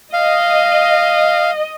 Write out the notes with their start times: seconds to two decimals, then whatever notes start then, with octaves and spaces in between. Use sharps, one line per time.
0.13 D#5 F5